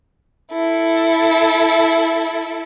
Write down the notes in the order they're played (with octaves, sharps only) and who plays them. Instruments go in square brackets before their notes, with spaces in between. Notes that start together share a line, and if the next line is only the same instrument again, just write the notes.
[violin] E4 A4